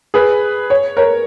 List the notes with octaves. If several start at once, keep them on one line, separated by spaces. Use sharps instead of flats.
G#4 B4
C#5
A#4 C#5